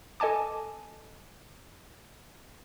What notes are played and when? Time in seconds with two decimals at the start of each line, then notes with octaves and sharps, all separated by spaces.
0.20 A4 D#5 G#5 A5 D6